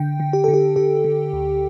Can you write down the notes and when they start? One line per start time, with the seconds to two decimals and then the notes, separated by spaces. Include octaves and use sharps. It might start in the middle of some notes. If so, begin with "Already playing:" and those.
Already playing: D3 G5
0.20 D3
0.33 G4
0.44 D3 A4
0.54 G4
0.76 D3 G4
1.04 D3
1.33 D2